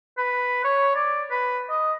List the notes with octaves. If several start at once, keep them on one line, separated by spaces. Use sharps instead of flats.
B4
C#5
D5
B4
D#5